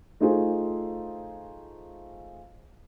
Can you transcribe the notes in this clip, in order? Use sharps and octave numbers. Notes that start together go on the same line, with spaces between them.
A3 D#4 F4 G#4 C5